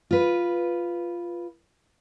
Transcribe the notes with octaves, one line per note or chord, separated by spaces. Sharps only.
F4 B4